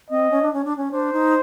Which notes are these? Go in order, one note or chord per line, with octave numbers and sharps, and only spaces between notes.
C4 D#5
C#4
D4
C#4
D4
C#4
D4 C5
D#4